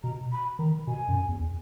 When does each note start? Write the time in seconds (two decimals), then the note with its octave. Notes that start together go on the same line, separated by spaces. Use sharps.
0.03 B2 A#5
0.32 B5
0.59 D#3 A#5
0.87 B2 G#5
1.08 F#2
1.29 E2